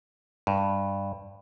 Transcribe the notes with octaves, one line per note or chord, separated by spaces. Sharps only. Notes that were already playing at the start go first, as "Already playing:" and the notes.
G2